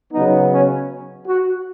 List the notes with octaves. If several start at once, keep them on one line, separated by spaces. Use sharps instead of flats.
C#3 F#3 B3 D#4
C#4
F#4